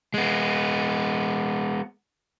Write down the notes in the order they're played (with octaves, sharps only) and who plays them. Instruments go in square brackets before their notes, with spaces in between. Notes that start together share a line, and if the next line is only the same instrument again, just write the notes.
[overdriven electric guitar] G#3 B3